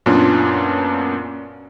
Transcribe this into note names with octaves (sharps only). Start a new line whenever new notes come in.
F#2 A#2 B3 C#4 D4 F4